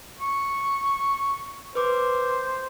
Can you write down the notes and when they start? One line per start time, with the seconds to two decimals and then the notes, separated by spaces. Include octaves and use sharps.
0.20 C#6
1.75 B4 C5 D6